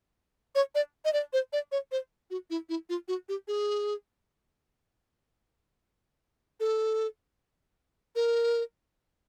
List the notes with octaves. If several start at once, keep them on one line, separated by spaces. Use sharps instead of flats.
C#5
D5
D#5
D5
C5
D5
C#5
C5
F#4
E4
E4
F4
F#4
G4
G#4
A4
A#4